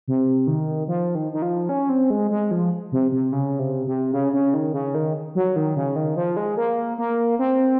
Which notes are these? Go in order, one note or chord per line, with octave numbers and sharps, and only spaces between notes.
C3
D#3
F3
D#3
D#3
F3
C#4
C4
G#3
G#3
F3
C3
C3
C#3
C3
C3
C#3
C#3
D#3
C#3
D#3
F#3
D#3
C#3
D#3
F3
G#3
A#3
A#3
C4